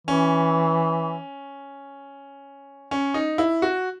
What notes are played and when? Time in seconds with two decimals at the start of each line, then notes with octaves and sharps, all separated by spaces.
0.07 E3 C#4
2.91 C#4
3.14 D#4
3.38 E4
3.62 F#4